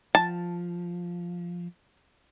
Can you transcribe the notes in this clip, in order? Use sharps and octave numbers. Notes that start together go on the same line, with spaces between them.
F3 A5